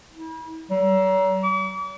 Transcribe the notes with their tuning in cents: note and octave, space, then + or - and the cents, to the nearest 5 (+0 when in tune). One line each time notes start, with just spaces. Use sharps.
E4 -40
F#3 +40
D6 -45